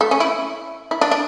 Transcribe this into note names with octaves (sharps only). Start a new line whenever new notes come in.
A3
C#4
E4
E4
D4
D4